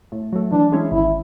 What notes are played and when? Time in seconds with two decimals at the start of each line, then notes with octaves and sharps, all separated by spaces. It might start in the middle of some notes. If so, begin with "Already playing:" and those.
0.12 A2
0.33 F#3 A3
0.52 E3 D4
0.72 G#3 C#4 E4
0.92 G#1 E4